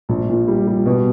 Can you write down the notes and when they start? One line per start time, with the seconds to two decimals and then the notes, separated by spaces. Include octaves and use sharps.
0.09 A#1
0.29 A#2
0.48 G3
0.67 G3
0.86 B2